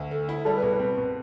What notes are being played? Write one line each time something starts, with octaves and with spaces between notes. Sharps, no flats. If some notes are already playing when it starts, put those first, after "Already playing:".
Already playing: D2
A3
E4
G3 A4
B4
B2
B4
C4
B2